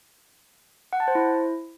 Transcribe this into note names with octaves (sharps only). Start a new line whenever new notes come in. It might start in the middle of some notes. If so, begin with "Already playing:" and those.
F#5
A5
C5
E4